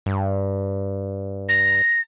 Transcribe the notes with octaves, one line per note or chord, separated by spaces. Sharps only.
G2
A#6